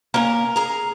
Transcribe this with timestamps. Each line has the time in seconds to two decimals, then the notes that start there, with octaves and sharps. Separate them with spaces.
0.14 A#3 C#4 A#4
0.56 G#4 A#5